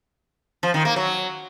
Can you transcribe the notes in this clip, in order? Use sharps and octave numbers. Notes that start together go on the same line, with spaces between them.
F3
D#3
A#3
F#3